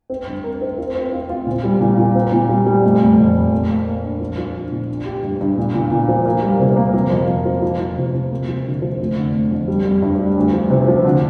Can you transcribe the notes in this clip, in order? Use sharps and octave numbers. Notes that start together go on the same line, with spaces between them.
C4
G2
A#4
C4
F4
C4
F4
F4
A#2
G3
A#2
A#2
C4
A#2
G3
G3
F1
F1
F2
F1
A#3
A#3
A#3
D4
F3
F3
D4
A#2
D4
G4
G2
G2
A#2
A#2
A#2
F3
A#3
G3
C3
A#3
F3
F2
F3
F3
F3
F3
C3
C3
A#3
F3
D3
F3
F1
D3
F1
F2
G3
G3
G2
G3
D2
F3
C3
F3
D3